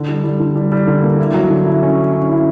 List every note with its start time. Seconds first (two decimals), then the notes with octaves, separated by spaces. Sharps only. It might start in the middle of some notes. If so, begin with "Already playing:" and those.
Already playing: D3
0.08 G3
0.24 G3
0.40 D3
0.56 G3
0.72 G3
0.87 D3
1.03 A#3
1.19 E4
1.34 F#3
1.50 D3
1.66 E4
1.83 C#4
1.97 E4
2.13 C#4
2.30 E4